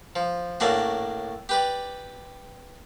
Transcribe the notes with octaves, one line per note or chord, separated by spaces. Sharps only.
F3
A2 A#3 C#4 D4 F#4
G4 B4 D5